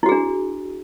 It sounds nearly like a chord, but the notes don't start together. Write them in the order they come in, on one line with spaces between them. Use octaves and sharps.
E4 F#4 G#4 D4